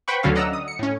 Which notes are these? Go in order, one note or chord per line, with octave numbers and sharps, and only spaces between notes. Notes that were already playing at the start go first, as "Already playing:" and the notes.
B4 C5 F#5 G5 B5 C#6
D2 D3 F#3 C#4 A4 F5
D5 D#5 F#5 A#5 E6
D#6
C#7
A2 C#4